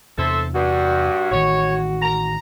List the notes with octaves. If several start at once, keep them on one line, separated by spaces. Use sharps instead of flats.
E2 C3 A4 C5 E5
G2 F#4
A1 D#3 C#5
A#5